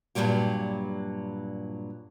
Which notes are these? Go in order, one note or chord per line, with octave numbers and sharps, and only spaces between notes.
G2 A#2 F#3 G3 G4